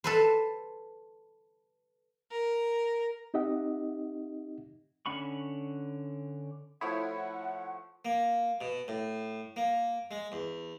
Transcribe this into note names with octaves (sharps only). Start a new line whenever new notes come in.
A4 B4 C5
A#4
C4 D#4 G4 D#5 E5 F#5
D3 C#4 F#5 B5 C#6
F3 A3 E4 C#5 F#5 D#6
A#3
B2
A2
A#3
G#3
E2